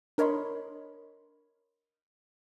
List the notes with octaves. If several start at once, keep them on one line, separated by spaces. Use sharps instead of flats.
D4 A#4 C#5 D#5 B5 C6